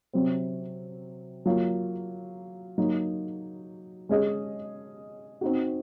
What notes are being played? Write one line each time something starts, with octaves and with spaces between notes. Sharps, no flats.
C3 F#3 C4
F#3 A#3 F4
F#3 A#3 D#4
G#3 C#4 G#4 D#5
C4 D#4 F#4